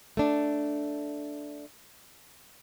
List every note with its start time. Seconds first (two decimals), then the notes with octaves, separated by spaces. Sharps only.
0.17 A3 D4